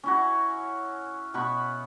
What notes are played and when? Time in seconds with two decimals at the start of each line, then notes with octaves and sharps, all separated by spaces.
0.04 C#4 E4 F#4
1.34 B2 F#5 B5 C#6